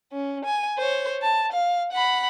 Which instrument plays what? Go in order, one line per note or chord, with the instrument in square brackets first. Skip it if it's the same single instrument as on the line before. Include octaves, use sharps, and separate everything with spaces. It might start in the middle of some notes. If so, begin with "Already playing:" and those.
[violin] C#4
G#5
C5 C#5
A5
F5
F#5 B5